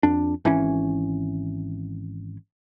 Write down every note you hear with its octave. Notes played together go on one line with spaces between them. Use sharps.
F2 D4
G#1 E3 C#4